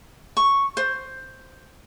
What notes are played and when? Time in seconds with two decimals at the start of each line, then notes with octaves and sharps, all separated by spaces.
0.37 C#6
0.77 C5